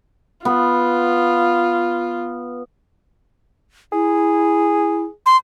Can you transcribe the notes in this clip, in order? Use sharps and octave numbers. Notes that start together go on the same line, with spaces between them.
B3 F4
E4 G#4
C6